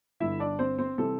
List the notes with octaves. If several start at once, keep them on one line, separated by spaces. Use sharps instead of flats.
G1 G2 D3 E4 E5
D4 D5
C4 C5
C4 C5
C3 E3 G3 C4 A4